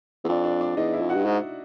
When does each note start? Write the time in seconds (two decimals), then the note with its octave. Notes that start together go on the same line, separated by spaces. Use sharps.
0.24 E2
0.28 F2 D4 D5
0.44 D4 D5
0.61 D4 D5
0.77 E2 D#4 D#5
0.93 E4 E5
1.01 F2
1.09 F#4 F#5
1.15 G2
1.26 G#2